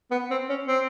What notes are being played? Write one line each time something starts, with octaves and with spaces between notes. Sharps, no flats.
B3
C4
C#4
C4